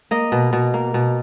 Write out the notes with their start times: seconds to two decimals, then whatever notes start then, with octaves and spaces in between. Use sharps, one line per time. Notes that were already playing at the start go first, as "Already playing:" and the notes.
0.11 A#3 D#5
0.32 B2
0.53 B2
0.74 A#3
0.94 B2